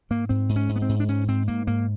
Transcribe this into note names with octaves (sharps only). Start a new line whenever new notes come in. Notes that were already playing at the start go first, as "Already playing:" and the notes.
G#2 A#3
G#2 C4
G#2
C#4
G#2
B3
C4
G#2
D4
G#2 C#4
G#2 C4
G#2 A#3
G#2 A#3